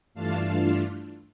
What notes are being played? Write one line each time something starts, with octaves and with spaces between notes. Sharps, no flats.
G2 E3 A3 D4 F4 F5 A5